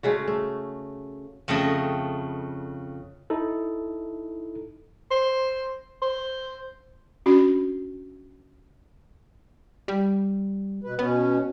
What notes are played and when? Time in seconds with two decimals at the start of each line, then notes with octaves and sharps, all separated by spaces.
0.03 C#3 G#3 A3 F#4
0.28 A3
1.48 F2 C#3 F3 A3 D#5 G5
3.30 D#4 E4 A4
5.11 C5
6.02 C5
7.26 C#4 D4 F#4
9.88 G3
10.84 B2 B4
10.99 B2 B3 C#4